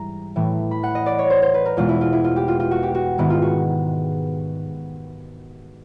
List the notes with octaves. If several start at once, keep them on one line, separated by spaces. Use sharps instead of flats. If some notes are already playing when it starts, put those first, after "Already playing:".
Already playing: G#2 E3 G3 A#5
A2 E3 A3
B5
F#5
D#5
D5
C#5
C5
C5
B4
A#4
E2 B2 G#3 F4
E4
F4
E4
F4
G4
F4
F4
F#4
G4
F#4
G#2 D#3 G#3 B3 E4
F4
F#4